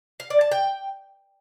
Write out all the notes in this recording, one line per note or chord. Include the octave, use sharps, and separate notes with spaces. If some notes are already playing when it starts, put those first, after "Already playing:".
F5
D5
A5
G5